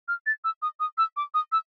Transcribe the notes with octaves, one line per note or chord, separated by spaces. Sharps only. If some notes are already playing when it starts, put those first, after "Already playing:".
F6
A6
E6
D#6
D#6
E6
D6
D#6
E6